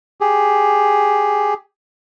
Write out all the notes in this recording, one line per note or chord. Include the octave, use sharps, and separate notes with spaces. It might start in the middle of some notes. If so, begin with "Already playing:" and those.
G4 G#4